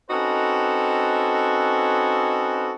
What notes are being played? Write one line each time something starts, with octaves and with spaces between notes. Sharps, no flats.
C4 C#4 D#4 F#4 A4 B4